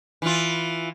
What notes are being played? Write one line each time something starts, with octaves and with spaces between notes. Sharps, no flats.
E3 F4